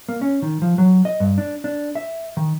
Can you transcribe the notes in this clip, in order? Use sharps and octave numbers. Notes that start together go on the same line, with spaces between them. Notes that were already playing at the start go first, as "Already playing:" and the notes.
A#3
C#4
D#3
F3
F#3
D#5
G2
D4
D4
E5
D#3